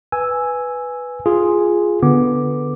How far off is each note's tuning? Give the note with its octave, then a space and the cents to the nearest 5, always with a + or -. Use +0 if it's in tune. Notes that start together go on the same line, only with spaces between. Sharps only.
B4 +0 G#5 +0 E6 +0
F4 +0 G#4 +0
D3 +0 B3 +0 D6 +0